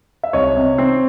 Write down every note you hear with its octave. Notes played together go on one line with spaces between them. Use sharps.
E5
C2 C#5 D#5
C3
C4